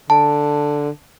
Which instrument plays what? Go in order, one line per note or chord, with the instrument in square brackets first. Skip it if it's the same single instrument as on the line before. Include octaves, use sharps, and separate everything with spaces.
[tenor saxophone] D3 [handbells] A5